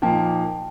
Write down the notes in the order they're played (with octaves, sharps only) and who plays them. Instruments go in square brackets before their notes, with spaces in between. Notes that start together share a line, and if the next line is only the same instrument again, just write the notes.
[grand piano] A#2 F3 A#3 D#4 [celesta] G5 A5